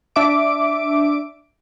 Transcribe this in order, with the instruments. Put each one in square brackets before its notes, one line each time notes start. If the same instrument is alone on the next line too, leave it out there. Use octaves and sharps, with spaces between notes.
[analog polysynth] D4 E5 D6 D7